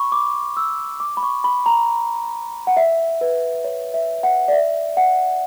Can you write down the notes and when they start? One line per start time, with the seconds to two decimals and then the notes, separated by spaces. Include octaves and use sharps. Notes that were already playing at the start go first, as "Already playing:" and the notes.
Already playing: B5 C#6
0.12 D6
0.57 E6
1.00 D6
1.17 B5
1.23 C#6
1.44 B5
1.66 A#5
2.67 F#5
2.77 E5
3.21 B4
3.64 C#5
3.94 E5
4.23 F#5
4.48 D5
4.53 E5
4.97 F#5